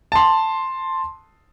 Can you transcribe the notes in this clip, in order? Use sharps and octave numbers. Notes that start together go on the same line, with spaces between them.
A5 C6